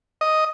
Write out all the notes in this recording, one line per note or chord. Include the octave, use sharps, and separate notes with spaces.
D#5